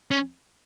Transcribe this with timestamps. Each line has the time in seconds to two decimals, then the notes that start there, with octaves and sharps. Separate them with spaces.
0.11 C#4